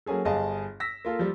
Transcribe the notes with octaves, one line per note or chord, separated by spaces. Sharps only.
F#3 A#3 C#4 G#4 A4
G1 G2 G#4 D#5 F5 A5
E6 A#6 B6
A#3 F4 A4
F3 G3